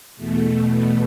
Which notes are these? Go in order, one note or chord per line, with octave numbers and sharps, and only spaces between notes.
E2 B2 A3